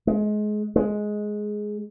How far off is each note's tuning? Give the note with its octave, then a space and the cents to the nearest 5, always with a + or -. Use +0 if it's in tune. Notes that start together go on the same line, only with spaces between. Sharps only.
G#3 +25
G#3 +10